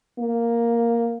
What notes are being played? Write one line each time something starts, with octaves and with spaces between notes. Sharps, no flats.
A#3